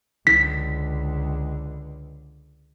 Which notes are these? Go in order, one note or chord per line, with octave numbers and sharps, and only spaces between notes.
C#2 D3 B6